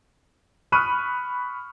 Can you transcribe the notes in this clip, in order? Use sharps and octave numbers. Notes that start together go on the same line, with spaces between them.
B5 C#6 D#6 F6 F#6 D#7